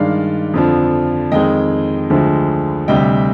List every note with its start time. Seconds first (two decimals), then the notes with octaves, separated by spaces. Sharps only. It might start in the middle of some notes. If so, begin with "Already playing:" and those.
Already playing: G2 D#3 G#3 D5 F5
0.54 F2 D3 F3
1.31 F2 D#3 G#3 D#5 G5
2.10 D2 D3 F3 G#3
2.88 D2 C3 G3 D#5 G5